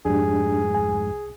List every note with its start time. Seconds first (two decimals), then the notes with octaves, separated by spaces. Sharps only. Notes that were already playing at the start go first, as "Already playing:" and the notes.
0.05 F2 G#2 D4 G4 G#4
0.75 C2 G#5